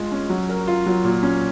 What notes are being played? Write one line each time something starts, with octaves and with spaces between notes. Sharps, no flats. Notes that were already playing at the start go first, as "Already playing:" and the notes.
Already playing: G#3 F4 G#4
C#4
F#3
A#4
F4
F#3
A#2
C#4